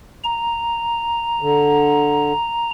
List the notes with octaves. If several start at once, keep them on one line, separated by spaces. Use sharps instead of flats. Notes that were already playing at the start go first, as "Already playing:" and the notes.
A#5
D3